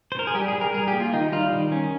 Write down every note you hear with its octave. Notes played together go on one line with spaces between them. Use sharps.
C5
A#4
G#4
G3 G4
G#4
G3
A#4
G3 G#4
G4
A#3
F4
D#3 D#4
G3 F4
D#3
C#4